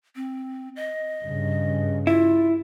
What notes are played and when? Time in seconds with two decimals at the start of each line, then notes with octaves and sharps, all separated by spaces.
0.16 C4
0.76 D#5
1.23 G2 C#3
2.07 E4 F4